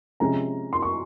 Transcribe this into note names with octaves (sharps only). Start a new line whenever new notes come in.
C3 F3 G#3 C#4 A#5
C6
C#6